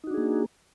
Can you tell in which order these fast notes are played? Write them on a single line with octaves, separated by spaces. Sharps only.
D#4 F#4 D4 G#4 A#3